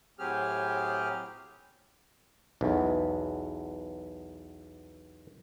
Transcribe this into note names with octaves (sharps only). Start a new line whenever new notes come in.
A2 F#3 C4 G4 G#4 F6
B1 E2